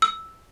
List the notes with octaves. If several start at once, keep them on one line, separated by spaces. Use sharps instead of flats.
E6